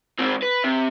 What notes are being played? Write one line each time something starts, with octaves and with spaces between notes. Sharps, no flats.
G#2 C4
B4
C3